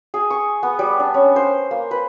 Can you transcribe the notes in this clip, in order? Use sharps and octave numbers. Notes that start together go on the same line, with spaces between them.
G#4
C#6
B3
G3
D4
C#4
C5
A#3
B4